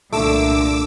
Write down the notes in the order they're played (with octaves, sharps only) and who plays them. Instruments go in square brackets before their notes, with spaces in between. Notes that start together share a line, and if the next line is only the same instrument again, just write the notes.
[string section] C2 A#2 D3 [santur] A3 [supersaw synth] D6 E6